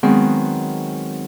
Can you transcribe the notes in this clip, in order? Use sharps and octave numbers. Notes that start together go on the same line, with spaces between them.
D#3 F#3 G#3 B3 C4